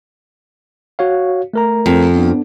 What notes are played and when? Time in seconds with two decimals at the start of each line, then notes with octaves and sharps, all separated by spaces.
0.99 F#4 C#5 F5
1.53 A3 A#4 A#5
1.86 F2
2.16 B3 D4